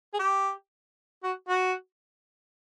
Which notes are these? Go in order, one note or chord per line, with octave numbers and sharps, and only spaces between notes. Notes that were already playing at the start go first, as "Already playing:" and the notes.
G#4
G4
F#4
F#4